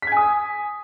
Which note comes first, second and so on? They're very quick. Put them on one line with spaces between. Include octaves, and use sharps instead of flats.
B6 G#6 G#5 D#6